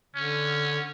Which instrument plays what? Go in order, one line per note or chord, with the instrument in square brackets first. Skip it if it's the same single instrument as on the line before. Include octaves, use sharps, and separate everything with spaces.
[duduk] D3 [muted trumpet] C#4